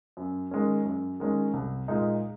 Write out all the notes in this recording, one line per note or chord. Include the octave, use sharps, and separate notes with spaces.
F#2
D#3 G#3 C#4
F#2
D#3 G#3 C#4
C2
A#2 G#3 D#4